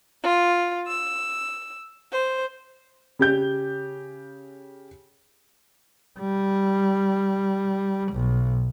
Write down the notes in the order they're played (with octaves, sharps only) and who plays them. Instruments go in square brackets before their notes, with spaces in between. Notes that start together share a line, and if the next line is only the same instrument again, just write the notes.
[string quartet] F4
E6
C5
[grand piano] C#3 G4 G6
[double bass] G3
B1